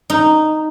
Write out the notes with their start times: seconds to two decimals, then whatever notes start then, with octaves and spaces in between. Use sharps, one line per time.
0.10 D#4